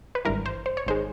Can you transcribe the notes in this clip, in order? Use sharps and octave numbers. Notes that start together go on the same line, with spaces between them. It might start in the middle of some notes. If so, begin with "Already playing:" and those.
B4
G#1 G2 E3 A#4
C5
C5
C#5
G#1 D#3 G#3 C5